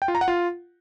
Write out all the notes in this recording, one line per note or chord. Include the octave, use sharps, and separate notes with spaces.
G5
F4
A#5
F#5
F4